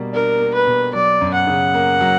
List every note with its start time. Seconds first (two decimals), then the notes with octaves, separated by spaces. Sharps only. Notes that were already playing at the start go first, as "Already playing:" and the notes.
Already playing: B2 G3 A#3
0.13 D4 A#4
0.40 A#3
0.54 B4
0.67 B2
0.94 F#3 D5
1.21 F#2
1.34 F#5
1.47 C#3
1.74 A#3
2.01 F#3